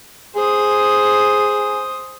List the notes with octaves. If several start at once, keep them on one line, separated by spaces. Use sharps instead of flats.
G#4 C5 D#6